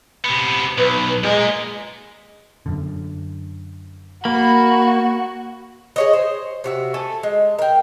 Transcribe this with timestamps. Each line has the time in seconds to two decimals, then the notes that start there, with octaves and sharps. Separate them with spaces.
0.25 C3 B3
0.78 B1 B4
1.24 A#2 G#3 A#4
2.66 F#2 D3
4.25 A#3 F#4 B5
5.96 G#4 C#5 D#5
6.13 C5
6.64 C3 F#4 E5
6.94 A3 A4 G#5
7.23 G#3
7.59 A#4 G5